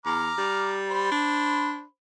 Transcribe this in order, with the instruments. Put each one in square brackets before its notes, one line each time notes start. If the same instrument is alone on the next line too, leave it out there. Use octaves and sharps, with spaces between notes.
[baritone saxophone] E2 [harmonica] A#5 D6 F6
[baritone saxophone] G3
[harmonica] C5 B5
[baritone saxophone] D4